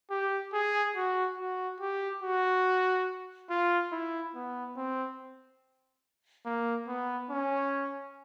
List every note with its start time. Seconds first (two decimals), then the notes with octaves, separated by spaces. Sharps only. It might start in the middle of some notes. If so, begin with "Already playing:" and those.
0.11 G4
0.53 G#4
0.96 F#4
1.39 F#4
1.80 G4
2.22 F#4
3.50 F4
3.92 E4
4.35 B3
4.77 C4
6.46 A#3
6.88 B3
7.30 C#4